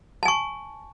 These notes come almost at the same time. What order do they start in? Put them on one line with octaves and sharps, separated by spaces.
A5 G#5 C#6